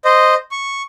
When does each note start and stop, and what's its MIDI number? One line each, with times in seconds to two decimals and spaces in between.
0.05 0.34 72
0.05 0.34 75
0.52 0.82 85